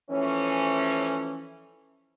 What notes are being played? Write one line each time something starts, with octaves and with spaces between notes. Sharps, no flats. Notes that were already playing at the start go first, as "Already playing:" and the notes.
E3 F3 A3 C#4